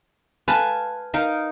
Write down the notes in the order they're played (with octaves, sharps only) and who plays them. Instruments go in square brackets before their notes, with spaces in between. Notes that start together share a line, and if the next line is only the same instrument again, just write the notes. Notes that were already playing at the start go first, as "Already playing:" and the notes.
[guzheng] B4 A5 [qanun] F5 G#5
[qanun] D#4 A#4 F5